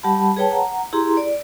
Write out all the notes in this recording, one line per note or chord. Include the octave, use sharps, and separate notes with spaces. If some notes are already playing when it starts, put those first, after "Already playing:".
G3 G4 F#5 A5 B5
G#4 B4 C#5 G5 A5
F#5 A#5
E4 G4 G#4 A#5 C6
D5